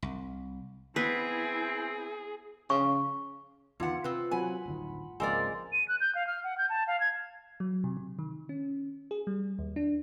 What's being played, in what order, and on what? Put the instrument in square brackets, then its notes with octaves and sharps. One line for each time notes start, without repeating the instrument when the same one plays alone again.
[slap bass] C2
[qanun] B3 B4 [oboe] C4 [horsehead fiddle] E4 [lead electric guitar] G#4
[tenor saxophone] C#3 [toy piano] C#6
[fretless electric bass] E2 D#3 B3 [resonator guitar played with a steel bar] D3 F#5 [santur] F4
[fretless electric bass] C3 [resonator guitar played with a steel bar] C4 B4
[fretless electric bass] F#3 C4 [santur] F#5 B5 [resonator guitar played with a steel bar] G#5
[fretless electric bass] D1 G1 D#3
[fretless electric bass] G#1 C#2 F3 [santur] G#3 A#3 [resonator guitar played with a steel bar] C4 A#4 D5
[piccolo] D#7
F#6
G6
F5
F6
F#5
G6
A5
F5
G#6
[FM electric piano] F#3
C3
C3
D#3
C#4
G#4
G3
D#2
D4